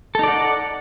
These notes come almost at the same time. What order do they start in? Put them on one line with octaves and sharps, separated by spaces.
A4 D#4 D5 F#5